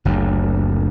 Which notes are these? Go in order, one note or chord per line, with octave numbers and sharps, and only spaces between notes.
F#1 D2